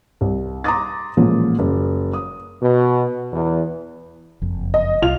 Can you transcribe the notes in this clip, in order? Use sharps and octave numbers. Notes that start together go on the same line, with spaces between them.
C2
A#5 C6 D6 D#6 A6
A1 A#2 F3 G#3
F#1
D#6
B2
E2
F#1 F2
D#5
C2 F4 F7